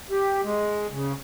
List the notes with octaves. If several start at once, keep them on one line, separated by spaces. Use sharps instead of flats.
G4
G#3
C#3